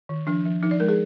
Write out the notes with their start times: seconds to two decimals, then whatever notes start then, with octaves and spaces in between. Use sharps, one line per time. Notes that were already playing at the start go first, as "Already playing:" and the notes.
0.09 D#3
0.27 F3 D4
0.45 F3
0.63 F3 D#4
0.71 D5
0.80 G#3 A#4
0.88 G#4